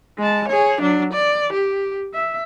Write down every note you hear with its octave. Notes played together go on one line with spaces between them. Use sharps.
G#3 A5
G#4 C#5
F#3 D4
D5
G4
E5